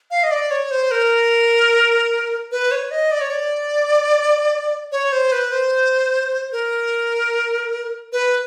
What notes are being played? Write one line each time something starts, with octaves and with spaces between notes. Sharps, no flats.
F5
D#5
D5
C#5
C5
A#4
B4
C#5
D#5
D5
C#5
D5
C#5
C5
B4
C5
A#4
B4